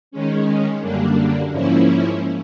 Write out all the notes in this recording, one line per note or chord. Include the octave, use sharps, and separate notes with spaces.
D#3 G#3 C#4
F#2 D3 G3 A#3 D4
G#2 F3 A#3 C#4 E4